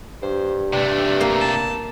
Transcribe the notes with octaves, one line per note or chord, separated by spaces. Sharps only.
G2 C5
C3 A3 D4
A#3
A5